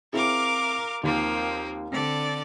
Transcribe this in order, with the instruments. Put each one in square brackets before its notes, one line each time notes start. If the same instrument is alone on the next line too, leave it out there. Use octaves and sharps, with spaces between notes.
[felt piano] C4 E4 G#4 [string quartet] A#4 F5 D6
[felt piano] D#2 [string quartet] F3 A#3 C4
[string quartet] D3 D5 [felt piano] C4